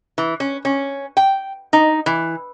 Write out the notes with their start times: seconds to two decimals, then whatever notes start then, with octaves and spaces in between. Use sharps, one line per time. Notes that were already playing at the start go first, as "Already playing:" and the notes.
0.18 E3
0.40 C#4
0.65 C#4
1.17 G5
1.73 D#4
2.06 E3